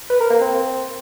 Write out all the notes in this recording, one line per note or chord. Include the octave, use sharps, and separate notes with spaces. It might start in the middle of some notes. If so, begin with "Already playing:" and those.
B4
A#4
A#3
C4